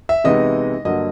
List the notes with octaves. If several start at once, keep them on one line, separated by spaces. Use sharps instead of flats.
E5
C3 E3 G#3 B3 D#4 D#5
G2 D3 F#3 A#3 D#5